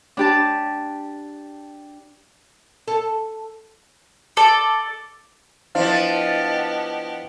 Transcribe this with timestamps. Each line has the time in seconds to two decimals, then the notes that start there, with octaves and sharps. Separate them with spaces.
0.17 D4 G4 A5
2.88 A4
4.37 A4 D5
5.75 F3 B3 D4 E4 G4 C5 D#5 F5